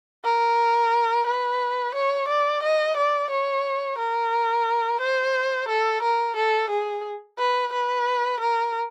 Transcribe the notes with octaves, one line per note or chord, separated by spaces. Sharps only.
A#4
B4
C#5
D5
D#5
D5
C#5
A#4
C5
A4
A#4
A4
G#4
B4
B4
A#4